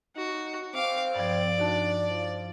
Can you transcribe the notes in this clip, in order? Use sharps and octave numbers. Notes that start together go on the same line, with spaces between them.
D#4 F#4
C4 F5 D6
G2 F3 D5
D4 D#4 F#4 A5
F3